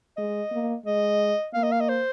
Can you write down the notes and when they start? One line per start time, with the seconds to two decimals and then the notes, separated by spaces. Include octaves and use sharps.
0.17 G#3 D#5
0.51 A#3
0.85 G#3 D#5
1.54 A#3 F5
1.63 D#5
1.72 F5
1.80 D#5
1.89 C5